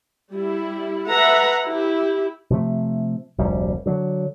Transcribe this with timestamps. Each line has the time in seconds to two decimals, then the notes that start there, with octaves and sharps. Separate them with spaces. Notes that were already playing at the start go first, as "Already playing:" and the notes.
0.33 G3 E4
1.10 A4 B4 E5 F#5 A#5
1.66 E4 G4
2.50 C3 F3 A3
3.38 F1 D2 G3
3.86 D3 F#3